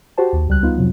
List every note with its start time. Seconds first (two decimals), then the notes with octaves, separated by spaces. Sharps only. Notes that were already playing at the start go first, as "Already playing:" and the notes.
0.18 F#4 G4 C5 A5
0.33 D#2
0.48 C#2 G3 F#6
0.63 B3 D#4 F4
0.78 F2 C3 F#3